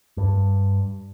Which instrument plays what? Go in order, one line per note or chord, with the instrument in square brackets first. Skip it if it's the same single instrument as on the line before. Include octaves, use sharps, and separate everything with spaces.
[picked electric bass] G2